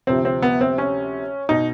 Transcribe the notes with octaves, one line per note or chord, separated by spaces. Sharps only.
D2 C3 F3 C4
C4
B3
C4
C#4
B2 D#4